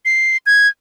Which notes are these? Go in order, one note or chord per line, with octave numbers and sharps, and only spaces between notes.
C7
G#6